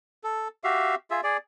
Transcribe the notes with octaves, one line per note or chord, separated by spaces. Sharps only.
A4
F#4 G4 E5 F5
F4 G#4 E5
G#4 D5